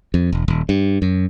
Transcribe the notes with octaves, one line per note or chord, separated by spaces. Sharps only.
F2
E1
D#1
G2
F#2